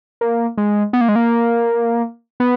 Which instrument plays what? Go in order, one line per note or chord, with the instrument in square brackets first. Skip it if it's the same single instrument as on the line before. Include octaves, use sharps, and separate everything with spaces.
[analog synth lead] A#3
G#3
B3
A#3
G#3
A#3
B3